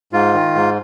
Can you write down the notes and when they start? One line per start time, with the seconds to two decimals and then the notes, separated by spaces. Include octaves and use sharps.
0.13 G#2 F4
0.34 D#3
0.55 G#2